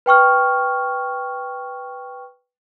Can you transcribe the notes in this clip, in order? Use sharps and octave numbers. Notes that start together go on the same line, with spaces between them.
B4 G5 C#6 F6